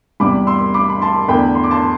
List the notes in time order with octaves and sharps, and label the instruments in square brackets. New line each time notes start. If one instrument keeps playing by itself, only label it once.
[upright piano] E2 C3 G3 B5 D6
C6 E6
B5 D6
B5
A5 C6
E2 D3 A3 G5 B5
C6
D6
A5 C6